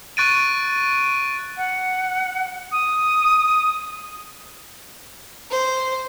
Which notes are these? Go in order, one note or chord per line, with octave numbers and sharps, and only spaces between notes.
C#6 F#6 A6 D7 D#7
F#5
D#6
C5